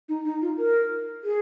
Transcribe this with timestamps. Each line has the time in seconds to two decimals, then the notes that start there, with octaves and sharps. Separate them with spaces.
0.09 D#4
0.25 D#4
0.42 F4
0.58 A#4
1.24 G#4